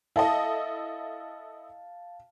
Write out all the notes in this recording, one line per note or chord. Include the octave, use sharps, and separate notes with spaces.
E4 A4 D#5 F5 A5